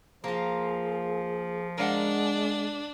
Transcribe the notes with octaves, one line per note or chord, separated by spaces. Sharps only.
F3 A#3 F4 G#4
G#3 D4 A#4 F5 F#5